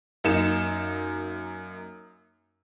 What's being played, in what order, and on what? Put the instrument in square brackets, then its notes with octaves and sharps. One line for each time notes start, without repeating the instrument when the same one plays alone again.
[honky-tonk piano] F#2 A#3 D#4 C#7 E7